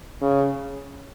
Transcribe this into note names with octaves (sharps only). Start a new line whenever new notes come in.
C#3